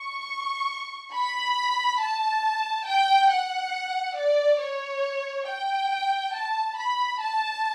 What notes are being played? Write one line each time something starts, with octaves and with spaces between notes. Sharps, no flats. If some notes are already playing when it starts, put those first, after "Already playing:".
Already playing: C#6
B5
A5
G5
F#5
D5
C#5
G5
A5
B5
A5